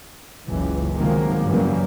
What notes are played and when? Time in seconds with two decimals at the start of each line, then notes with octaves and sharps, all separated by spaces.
0.47 F#1 C#2 E3
0.95 C3 D#3 F3 F#3 G#3 A#3
1.46 F#2 C#3 E3 F#3 G3 A#3